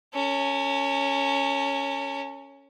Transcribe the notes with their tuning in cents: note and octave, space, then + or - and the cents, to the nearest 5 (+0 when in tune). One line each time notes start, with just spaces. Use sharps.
C#4 +0 A4 +45